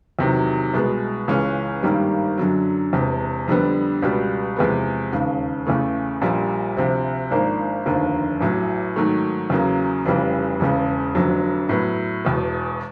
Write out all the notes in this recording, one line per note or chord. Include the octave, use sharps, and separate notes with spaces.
E2 C3 D#3 F#3
C2 B2 G#3 B3
C#2 C#3 E3 G#3 C#4
G#1 G2 D#3 G3 A#3
F#2 D3 F#3
E1 E2 C3
F2 D3 G3 B3
C#2 B2 G3
E2 C3 F3 G#3 B3
E1 D#2 C#3
E2 C#3 E3 A3
A#1 A#2 G3
D2 C3 F3
G#1 G#2 F3 A#3 D4
F1 D#2 D3 F3 A#3
A1 A2 F#3
G#2 D#3 F#3 A3
E2 C#3 F#3 A#3
F1 F2 C#3 E3 G3
E1 E2 C#3
F1 F2 D3 F#3
A2 F#3 B3
E1 E2 B2